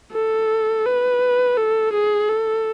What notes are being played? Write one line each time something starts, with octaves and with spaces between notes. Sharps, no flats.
A4
B4
A4
G#4
A4